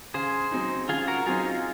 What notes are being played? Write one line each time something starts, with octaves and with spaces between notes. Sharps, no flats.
C#3 G#4 C5
F#3 C4 D#4
C#3 F4 G#4
F#4 A#4
F#3 C4 D#4 F4 G#4
F4 G#4